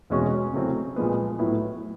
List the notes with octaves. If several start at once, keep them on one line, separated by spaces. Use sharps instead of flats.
E2 B2 G#3 C#4 F#4
C#3 F#3 A3 C4 E4
A#2 F3 G#3 B3
A2 F#3 B3 E4